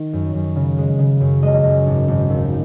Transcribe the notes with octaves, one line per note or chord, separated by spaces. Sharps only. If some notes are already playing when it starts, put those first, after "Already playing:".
Already playing: D#3
F#2
F#2
C#3
G#3
C#3
F#2
G#3 D#5
F#2
G#1
G#1
D#2